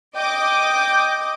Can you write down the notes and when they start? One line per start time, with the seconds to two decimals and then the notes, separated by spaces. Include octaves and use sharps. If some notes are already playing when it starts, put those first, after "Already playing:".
0.16 D#5 G5 D6